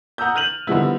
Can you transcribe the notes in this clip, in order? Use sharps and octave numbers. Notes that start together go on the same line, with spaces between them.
F#5 A#5 D#6 E6 G6
F6 G6 D#7 F7 F#7
D3 D#3 F3 G3 B3 E4